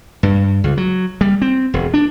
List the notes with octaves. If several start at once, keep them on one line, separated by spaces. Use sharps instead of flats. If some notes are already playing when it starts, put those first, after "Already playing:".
G2
C#2
F#3
G3
C4
E1
D4